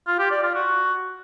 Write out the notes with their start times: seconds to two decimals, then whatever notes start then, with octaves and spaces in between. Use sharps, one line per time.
0.07 F4
0.19 G4
0.31 D5
0.43 F4
0.55 F#4